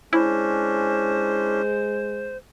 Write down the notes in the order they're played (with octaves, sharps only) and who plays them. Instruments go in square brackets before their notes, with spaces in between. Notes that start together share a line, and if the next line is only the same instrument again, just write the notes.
[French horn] G#3 [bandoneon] C#4 D4 [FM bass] E4 [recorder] C5